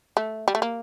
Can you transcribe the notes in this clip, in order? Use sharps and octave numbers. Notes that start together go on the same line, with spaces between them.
A3
G3
A3
A#3